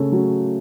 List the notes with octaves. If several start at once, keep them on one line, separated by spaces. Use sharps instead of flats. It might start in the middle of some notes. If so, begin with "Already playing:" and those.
Already playing: C#3 A3
F#3